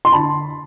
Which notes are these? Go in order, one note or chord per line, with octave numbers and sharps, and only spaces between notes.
C6
D3 A5 B5